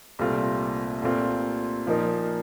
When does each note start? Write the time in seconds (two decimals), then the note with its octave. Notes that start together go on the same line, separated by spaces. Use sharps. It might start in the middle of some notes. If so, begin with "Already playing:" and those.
0.19 C2 A#2 A3 C4 F4
1.02 A#2 A3 C4 F4
1.86 A#2 F3 A#3 D#4 A#4